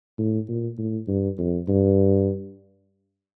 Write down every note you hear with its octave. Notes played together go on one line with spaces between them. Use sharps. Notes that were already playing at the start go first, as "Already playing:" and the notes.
A2
A#2
A2
G2
F2
G2